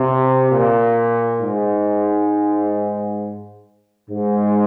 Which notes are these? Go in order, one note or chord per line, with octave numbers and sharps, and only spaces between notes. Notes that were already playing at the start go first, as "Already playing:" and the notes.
Already playing: C3
A#2
G#2
G#2